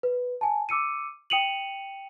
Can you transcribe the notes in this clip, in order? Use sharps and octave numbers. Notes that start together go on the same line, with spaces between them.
B4
G#5 A5
D6 E6 C#7 D#7
G5 D#6 C#7 D#7 F7 F#7